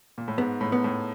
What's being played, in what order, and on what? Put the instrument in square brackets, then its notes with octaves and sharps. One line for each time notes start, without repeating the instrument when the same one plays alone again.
[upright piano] A#2
A2
[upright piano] G#2 [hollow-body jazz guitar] B3
[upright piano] A2
[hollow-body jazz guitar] B3
[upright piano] A2